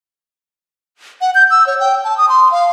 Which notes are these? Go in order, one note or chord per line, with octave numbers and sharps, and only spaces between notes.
F#5
G6
E6
C#5
G5
A5
D#6
C6
F5